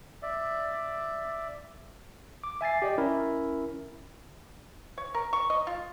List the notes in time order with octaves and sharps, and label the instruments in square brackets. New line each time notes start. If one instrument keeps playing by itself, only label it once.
[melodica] D5 E5
[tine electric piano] D6
E5 G#5 A6 C7
G4 D5 D#5
C#4 E4 A#4
[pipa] C#5
A#4
C#6
D#5
F4